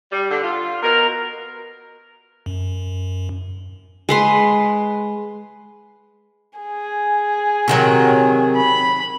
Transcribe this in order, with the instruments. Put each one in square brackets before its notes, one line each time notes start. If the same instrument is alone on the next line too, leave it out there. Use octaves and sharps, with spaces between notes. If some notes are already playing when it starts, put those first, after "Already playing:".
[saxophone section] G3
D3
F4
B2 A#4
[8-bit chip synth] F#2
[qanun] G#3 B4 C6
[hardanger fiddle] G#4
[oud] C3 D#3 F#3
[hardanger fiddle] B5